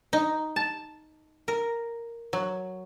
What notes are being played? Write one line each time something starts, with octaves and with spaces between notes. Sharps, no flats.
D#4
A5
A#4
F#3